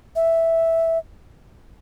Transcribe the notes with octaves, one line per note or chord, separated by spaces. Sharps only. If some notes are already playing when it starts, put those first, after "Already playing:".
E5